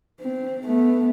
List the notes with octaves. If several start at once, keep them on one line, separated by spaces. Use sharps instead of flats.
C4
A3 B3